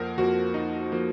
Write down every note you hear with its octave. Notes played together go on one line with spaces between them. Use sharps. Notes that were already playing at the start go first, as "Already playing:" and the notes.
Already playing: F2 F3 A#3 A#4 F#5
F2 F3 A#3 F#4
D#4
F3 A#3